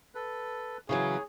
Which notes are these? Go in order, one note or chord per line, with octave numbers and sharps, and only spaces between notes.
A4 B4
C#3 E3 F#3 G#4 C#5